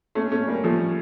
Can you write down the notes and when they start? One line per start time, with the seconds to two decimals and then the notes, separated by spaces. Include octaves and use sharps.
0.15 A3 C#4
0.31 A3 C#4
0.47 G3 A#3
0.64 F3 A3